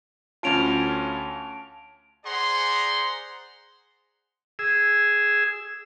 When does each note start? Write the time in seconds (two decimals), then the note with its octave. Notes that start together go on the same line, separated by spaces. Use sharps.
0.43 D2 C#4 F4 A5 D7 F7
2.25 G#4 C5 D5 F#5 A#5 C6
4.59 G#4 E6